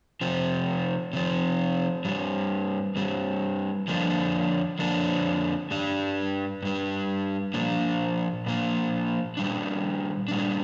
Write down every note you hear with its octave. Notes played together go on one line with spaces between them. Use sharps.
C3 F3 C4
C3 F3 C4
G2 G3 C4
G2 G3 C4
F2 D3 F3 A#3 D4
F2 D3 F3 A#3 D4
G2 G3 D4
G2 G3 D4
A#2 F3 A#3 D4
A#2 F3 A#3 D4
A#2 G3 D4
A#2 G3 D4